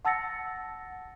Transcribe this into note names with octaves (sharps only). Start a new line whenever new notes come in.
F#5 A5 E6 A6 A#6 C#7